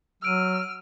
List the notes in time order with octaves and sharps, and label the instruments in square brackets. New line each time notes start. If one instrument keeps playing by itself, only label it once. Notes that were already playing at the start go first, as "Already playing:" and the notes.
[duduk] F#3 [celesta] E6 D7 D#7 [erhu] F6